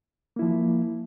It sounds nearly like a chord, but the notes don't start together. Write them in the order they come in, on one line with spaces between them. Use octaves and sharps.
A#3 E4 F3